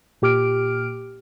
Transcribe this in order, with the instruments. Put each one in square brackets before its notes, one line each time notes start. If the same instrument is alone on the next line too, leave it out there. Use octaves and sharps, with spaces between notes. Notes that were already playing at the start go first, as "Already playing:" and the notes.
[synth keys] A#2 G4 D6 F6 D7